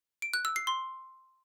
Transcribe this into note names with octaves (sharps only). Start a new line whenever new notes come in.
D7
F#6
E6
C7
C6